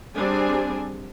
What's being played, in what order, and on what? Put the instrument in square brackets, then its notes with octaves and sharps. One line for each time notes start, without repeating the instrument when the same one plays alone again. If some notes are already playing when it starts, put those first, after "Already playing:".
[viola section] G3 C4 D4 G#4 G#5